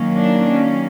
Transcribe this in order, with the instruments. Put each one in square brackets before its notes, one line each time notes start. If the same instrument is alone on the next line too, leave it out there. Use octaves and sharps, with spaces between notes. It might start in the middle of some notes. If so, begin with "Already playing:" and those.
Already playing: [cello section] D#3 F#3 A#3 C#4
D4
C#4